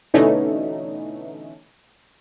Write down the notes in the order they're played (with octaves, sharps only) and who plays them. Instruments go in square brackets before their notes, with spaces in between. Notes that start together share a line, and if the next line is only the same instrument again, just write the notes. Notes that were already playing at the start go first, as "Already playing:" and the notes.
[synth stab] B2 D3 E3 A3 C#4 D#4